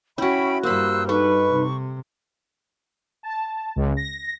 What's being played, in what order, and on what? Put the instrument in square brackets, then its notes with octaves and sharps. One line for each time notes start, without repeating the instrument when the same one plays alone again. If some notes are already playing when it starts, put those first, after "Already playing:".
[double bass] C#4 [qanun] E4 F#4 [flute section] E5 G5 B5
[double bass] G2 G3 [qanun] A#3 B5 [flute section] C5 E6 F#6
[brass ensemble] D#4 B4 [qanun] A4 [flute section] C#6
[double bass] C3
[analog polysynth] A5
C#2
A#6